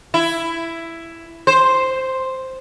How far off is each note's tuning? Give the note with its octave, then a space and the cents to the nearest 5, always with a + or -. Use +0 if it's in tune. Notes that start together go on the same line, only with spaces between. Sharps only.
E4 +10
C5 +0